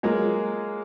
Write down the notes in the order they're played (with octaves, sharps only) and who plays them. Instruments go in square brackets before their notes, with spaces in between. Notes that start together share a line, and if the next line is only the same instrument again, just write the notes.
[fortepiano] F#3 G#3 A#3 F4